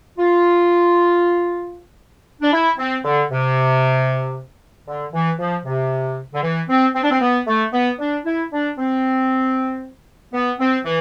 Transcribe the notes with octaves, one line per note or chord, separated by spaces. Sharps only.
F4
D4
E4
C4
D3
C3
D3
E3
F3
C3
D3
E3
C4
C4
D4
C4
B3
A3
B3
D4
E4
D4
C4
B3
C4
E3